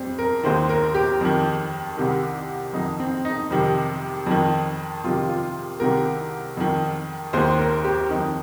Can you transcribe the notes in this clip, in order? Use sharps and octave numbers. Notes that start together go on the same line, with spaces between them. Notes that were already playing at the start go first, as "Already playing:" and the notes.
Already playing: F2 G3 C4
A#4
D#2 D#3 C5
A#4
G4
F2 D#3
C2 C3 D#3
F2 D#3 D#4
C4
D#4
F2 C3 D#3
F2 D#3
F2 C3 D#3 F4
F4
C2 C3 D#3 A#4
F2 D#3
D#2 D#3 C5
A#4
G4
F2 D#3 D#4